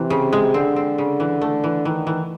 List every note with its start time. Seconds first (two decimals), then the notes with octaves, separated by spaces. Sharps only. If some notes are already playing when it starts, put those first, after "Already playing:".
Already playing: C3 E3
0.10 C#3
0.33 G#3
0.54 D3 C4
0.76 C4
0.98 C#3
1.20 E3
1.42 A3
1.64 E3
1.85 D#3 E3
2.07 E3